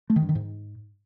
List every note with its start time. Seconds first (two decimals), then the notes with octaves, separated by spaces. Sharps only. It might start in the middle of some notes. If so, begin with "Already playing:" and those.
0.10 A3
0.16 D#3
0.22 G2
0.29 D#3
0.35 G#2